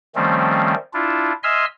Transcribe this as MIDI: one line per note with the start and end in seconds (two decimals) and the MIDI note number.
0.15 0.74 51
0.15 0.74 53
0.15 0.74 55
0.15 0.74 57
0.15 0.74 60
0.15 0.74 61
0.94 1.32 62
0.94 1.32 64
0.94 1.32 65
1.43 1.65 75
1.43 1.65 76
1.43 1.65 80
1.43 1.65 84
1.43 1.65 88
1.43 1.65 89